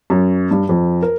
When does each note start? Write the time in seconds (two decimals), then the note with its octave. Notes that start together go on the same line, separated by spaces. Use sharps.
0.10 F#2
0.51 G2
0.69 F2
1.03 A#4